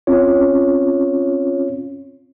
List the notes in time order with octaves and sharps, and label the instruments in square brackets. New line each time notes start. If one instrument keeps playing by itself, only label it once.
[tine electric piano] C4 C#4 F4 C#5